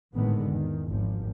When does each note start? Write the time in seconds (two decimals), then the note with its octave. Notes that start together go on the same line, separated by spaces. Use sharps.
0.14 G#1 A2 D3 D#3 G#3 B3
0.47 E2 D#3
0.89 G#1 F3